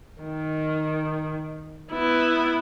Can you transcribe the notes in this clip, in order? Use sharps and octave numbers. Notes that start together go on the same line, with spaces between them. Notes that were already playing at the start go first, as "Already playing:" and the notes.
D#3
B3 E4